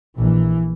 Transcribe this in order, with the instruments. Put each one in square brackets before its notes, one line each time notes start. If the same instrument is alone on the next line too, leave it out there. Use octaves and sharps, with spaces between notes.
[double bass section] A#1 A#2 E3